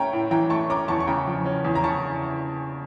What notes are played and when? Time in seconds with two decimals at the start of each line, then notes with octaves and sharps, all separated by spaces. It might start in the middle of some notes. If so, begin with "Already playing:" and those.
Already playing: A3 C#4 G5 A#5
0.13 A2
0.31 E3 G5 A#5
0.50 A3 A5 C#6
0.70 C#4 A#5 D6
0.88 E2 A5 C#6
1.00 C#6
1.07 C#3 G5 A#5
1.27 F3
1.46 C#4
1.65 E2
1.75 A#5
1.83 C#3 A5 C#6